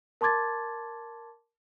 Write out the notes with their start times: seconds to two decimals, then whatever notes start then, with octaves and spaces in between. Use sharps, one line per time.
0.21 A#4 A5 C6 D6 G#6 A6